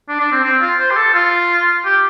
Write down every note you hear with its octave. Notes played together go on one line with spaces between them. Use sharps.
D4
D4
C4
C4
F4
C5
G4
A4
F4
G4